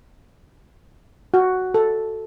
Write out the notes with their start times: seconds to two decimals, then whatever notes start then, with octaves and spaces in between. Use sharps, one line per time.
1.34 F#4
1.74 A4